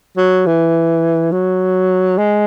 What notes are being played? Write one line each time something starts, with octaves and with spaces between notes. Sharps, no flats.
F#3
E3
F#3
G#3